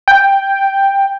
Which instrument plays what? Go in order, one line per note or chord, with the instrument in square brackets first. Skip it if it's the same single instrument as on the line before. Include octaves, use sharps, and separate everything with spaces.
[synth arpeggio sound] G5